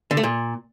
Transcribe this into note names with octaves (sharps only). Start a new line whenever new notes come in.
D3
A3
A#2